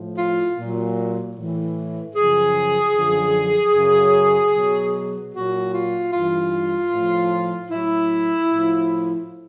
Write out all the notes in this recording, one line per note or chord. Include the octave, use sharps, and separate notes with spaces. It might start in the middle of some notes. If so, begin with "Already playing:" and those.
Already playing: A2 F3
F4
A#2 F#3
A2 E3
F#2 C#3 F3 G#4
F#2 D3 F3
F#2 C#3 F#3
B2 F#3
A#2 F#3 F#4
F4
G2 E3 F4
A2 F3
A2 F#3 E4
A2 F3